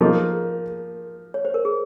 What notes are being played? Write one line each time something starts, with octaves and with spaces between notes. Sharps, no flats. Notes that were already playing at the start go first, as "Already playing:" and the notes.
F3 A#3 D#4 G#4
C#5
C5
A#4
G#4